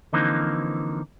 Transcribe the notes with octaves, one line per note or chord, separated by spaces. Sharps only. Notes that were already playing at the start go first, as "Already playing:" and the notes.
D3 E3 F3 A#3 C4 D#4